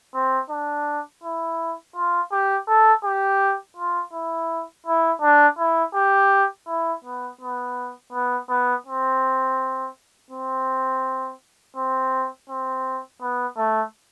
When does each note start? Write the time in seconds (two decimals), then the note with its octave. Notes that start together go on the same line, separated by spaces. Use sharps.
0.14 C4
0.50 D4
1.23 E4
1.96 F4
2.31 G4
2.68 A4
3.04 G4
3.76 F4
4.13 E4
4.87 E4
5.22 D4
5.58 E4
5.94 G4
6.68 E4
7.04 B3
7.41 B3
8.12 B3
8.49 B3
8.86 C4
10.31 C4
11.76 C4
12.50 C4
13.21 B3
13.57 A3